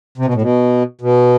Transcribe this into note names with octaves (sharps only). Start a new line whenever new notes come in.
C3
B2
A2
B2
B2